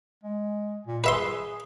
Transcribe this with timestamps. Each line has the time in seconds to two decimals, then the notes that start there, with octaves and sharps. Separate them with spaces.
0.24 G#3
0.87 A#2
1.04 G#4 B4 E5 C6